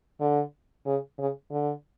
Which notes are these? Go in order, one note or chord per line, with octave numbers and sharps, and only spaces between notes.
D3
C#3
C#3
D3